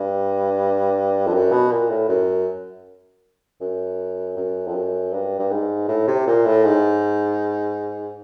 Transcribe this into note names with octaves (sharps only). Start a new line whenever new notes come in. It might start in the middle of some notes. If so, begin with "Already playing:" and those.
Already playing: G2
F2
F#2
B2
A#2
A2
F#2
F#2
F#2
F2
F#2
G2
G2
G#2
A2
C3
A#2
A2
G#2